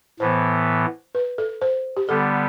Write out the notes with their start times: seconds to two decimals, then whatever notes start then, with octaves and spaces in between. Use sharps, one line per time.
0.20 A2 E3 B3 C5
1.15 B4
1.38 A4
1.61 C5
1.97 G4
2.08 D3 G3 B3 A4